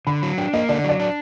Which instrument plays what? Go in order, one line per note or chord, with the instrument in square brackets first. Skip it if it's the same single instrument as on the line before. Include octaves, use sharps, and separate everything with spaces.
[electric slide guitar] D3 [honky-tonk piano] B5
[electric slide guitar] F#3
[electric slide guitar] D4 [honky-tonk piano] G5
[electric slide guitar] A#3 [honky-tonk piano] D#5
[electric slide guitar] D3 [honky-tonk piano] D5
[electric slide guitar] F#3 [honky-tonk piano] D5
[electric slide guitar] D4